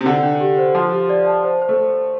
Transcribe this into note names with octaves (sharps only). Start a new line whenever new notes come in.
C3
D3 D4
D4
G4
C5
F3 C6
G4
D5
A5
C5
C5
A3